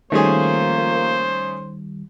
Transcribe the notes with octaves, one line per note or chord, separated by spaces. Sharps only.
D#3 F3 G3 A3 A#3 C#4 G#4 C5